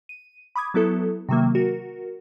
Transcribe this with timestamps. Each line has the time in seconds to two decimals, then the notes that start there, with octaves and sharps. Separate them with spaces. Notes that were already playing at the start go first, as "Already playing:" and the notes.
0.09 D#7
0.56 B5 D6 D#6 G#6
0.74 F#3 B3 E4 A4
1.29 C3 D#3 F#3 A#3
1.55 F#4 A#4